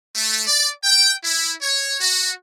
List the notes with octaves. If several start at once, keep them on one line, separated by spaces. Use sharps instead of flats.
A3
D5
G5
E4
C#5
F#4